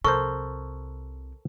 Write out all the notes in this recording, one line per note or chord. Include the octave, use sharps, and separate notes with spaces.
C2 C3 A4 A#4 C5 C#6